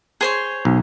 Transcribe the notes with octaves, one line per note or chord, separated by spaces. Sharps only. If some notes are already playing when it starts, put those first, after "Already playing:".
G#4 C5 C#5
B1